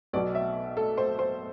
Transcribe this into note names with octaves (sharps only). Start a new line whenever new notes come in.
B1 B2 F#3 D5
E5
A4
C5
C5